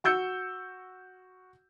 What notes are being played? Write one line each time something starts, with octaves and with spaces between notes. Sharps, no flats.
F#4 E6 G6 C#7